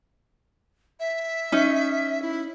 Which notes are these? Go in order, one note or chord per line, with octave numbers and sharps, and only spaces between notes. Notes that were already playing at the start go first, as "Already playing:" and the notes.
E5
C#4 D#4
E4